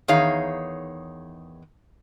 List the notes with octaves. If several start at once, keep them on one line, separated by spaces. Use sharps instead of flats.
E2 D#3 D#4 G#4 C#5 F5